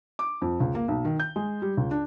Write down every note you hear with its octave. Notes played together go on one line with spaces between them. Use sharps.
D6
F2
C#2
A#3
B1
D#3
G6
G#3
G3
C#2
D4